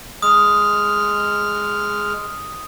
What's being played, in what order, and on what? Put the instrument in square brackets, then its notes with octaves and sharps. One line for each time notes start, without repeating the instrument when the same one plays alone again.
[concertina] G#3 F6 [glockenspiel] D#6